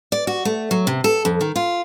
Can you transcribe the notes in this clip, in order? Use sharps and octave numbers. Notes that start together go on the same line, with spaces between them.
D5
F#4
A3
F#3
C3
A4
F2
D#3
F4